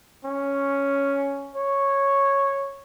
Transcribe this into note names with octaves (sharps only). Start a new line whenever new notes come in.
C#4
C#5